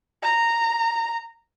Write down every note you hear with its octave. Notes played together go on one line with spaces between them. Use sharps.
A#5